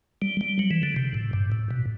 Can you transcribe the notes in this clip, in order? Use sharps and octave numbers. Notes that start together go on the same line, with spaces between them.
G3
G3
F#3
E3
D3
C3
A2
G2
A2
B2